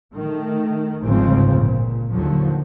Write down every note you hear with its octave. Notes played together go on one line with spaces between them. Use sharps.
D#3 A3
G1 C#2 G#2 C#3 F3 C4
A#2
D#2 D3 F3 F#3